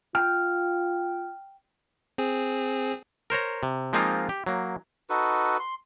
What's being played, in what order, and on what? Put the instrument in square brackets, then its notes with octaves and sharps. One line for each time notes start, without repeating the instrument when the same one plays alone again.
[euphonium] F4 [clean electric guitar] G5 [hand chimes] F6
[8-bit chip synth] C4 G#4
[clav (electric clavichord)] A#4 C5 C#5 A#5
C3
F3 G#3 A#3 C4 D#4 F4
G4
F#3 A#3
[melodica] D#4 F#4 A4 B4
C6